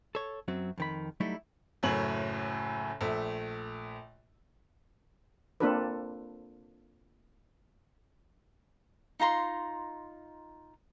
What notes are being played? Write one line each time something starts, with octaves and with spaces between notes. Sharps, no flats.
A4 C#5
F#2 F#3 C4
F2 D#3 B5
F#3 G3 A3 D#4 E4
F#1 F#2 A2 C#5 F#7
A#1 A3 E5
A#3 C4 D4 F4 A4 B4
D#4 F4 A#5 C6